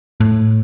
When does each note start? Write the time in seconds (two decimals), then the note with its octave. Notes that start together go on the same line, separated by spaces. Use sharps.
0.20 A2